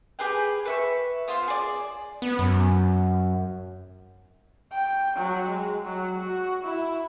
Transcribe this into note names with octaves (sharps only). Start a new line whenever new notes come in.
G4 G#4 B4 G5
B4 E5 C#6
B3 F4 C5
G#4 D5
B3
F#2
G5
F#3
G#3
F#3
F#4
E4